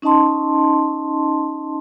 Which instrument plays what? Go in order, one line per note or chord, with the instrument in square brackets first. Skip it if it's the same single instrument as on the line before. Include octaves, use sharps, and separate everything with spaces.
[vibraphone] C#4 D#4 D#5 A5 C6